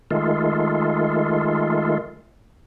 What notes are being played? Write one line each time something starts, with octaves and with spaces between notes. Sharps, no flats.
D#3 G#3 A3 F4